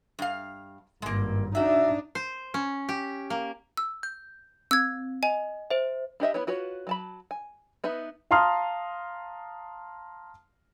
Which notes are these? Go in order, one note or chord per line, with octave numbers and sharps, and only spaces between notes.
G2 F5
G#1 G2 G#3 A#3
D4 D#4 F#4 E5
C5
C#4
G4
A#3
E6
G6
C4 E6 G#6
D#5 G#5
C5 E5
D4 G4 D#5 E5
B3 E4 B4 C#5
F4 F#4 B4 C#5
F#3 A5 B5
G#5
B3 D#4 B4 E5
F5 A5 A#5 C6 D#6 F6